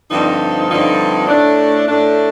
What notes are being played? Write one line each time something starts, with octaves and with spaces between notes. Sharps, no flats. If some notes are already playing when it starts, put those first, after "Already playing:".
G2 D3 F3 C4 D#4
G2 D3 F3 C4 D#4
A2 A3 D4
A2 A3 D4